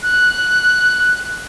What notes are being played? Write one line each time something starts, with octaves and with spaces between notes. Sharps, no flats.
F#6